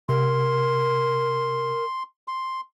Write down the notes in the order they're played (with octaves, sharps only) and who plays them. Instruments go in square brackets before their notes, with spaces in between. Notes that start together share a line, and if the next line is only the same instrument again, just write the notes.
[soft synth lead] C3 [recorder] A#4 [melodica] C6
[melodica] C6